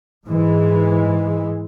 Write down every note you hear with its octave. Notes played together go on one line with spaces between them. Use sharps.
G#2 E3 G#3